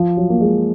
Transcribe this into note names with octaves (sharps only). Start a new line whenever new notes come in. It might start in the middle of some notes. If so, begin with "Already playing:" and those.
Already playing: F3
F#3
A#3
G#3